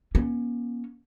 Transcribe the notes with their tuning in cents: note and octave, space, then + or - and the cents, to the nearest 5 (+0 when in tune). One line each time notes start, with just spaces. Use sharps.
A#3 +45 C#4 +0